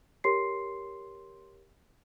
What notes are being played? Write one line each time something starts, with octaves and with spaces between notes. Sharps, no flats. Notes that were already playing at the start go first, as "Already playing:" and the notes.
G4 A#4 C#5 C6 C7